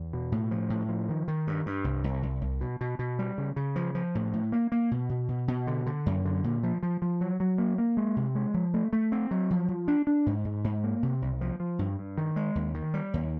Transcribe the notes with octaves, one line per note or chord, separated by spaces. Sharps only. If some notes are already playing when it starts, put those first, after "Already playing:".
Already playing: E2
B2
A2
F3
A2
F3
D#3
D#3
G2
G2
C2
C2
C2
C2
B2
B2
B2
G3
C#3
C#3
F3
F3
A2
A2
A#3
A#3
B2
B2
B2
B2
D3
D3
F#2
D3
A#2
F3
F3
F3
F#3
F#3
A#3
A#3
G#3
C3
G#3
F3
A3
A3
C4
F#3
F3
F3
D4
D4
G#2
G#2
G#2
A#3
C3
C2
F3
F3
G2
G2
D#3
G#3
D#2
D#3
G3
D#2